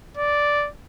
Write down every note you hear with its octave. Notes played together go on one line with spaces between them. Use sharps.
D5